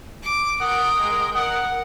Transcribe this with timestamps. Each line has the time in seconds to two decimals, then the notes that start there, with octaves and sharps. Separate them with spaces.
0.23 D6
0.60 A#4 F#5 G5 D#6
1.00 G#3
1.35 A#4 F#5